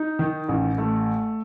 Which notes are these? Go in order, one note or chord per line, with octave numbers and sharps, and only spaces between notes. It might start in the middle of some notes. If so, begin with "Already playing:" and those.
Already playing: D#4
D#3
A1
A3